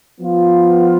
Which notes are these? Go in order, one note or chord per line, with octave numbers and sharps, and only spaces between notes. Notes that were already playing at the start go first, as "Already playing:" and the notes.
F3 B3 F4